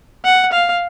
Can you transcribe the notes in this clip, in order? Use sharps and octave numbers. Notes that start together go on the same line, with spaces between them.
F#5
F5